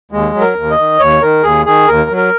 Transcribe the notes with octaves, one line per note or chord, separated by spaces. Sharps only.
D#2 G#3
F#3
A#4
D#2
D#5
D#3
D#2 C#5
D#3 A#4
D#2 G#4
D#3 G#4
D#2 A#4
F#3
A#4